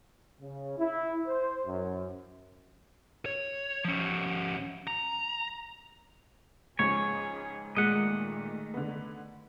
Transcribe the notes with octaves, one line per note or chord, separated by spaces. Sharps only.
C#3
E4
C5
F#2
C#5
F3 C#4
A#5
C#2 G#2 F3 C#4 G#4 C#5
A#2 D#3 G#3 A3 D#5 F#5
D3 B3